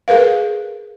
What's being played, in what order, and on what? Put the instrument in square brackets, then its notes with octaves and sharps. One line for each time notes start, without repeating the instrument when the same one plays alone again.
[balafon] G#4 A#4 B4 F5